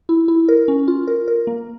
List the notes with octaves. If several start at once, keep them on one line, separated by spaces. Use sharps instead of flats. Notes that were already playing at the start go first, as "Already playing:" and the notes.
E4
E4
A#4
C#4
F4
A#4
A#4
A#3